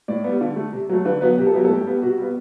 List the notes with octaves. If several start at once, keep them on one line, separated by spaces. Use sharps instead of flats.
A2 D5
B3
G3
D3
A3
C3
F#3 A3
D3 B4
F#3 B3 B4
C3 G4
A4
F#3 B3 G4
A4
A2 G4
G3 B3
C3 F#4
G3 B3